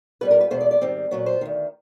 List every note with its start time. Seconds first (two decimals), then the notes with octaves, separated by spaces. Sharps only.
0.21 A#2 G3 B3 B4
0.31 A#4
0.41 B4
0.51 E2 B2 G#3 B3 C5
0.61 D5
0.71 D5
0.81 G#2 D#3 G3 C4
1.11 A#2 F#3 B3 C#5
1.26 C5
1.41 C3 D#3
1.46 D2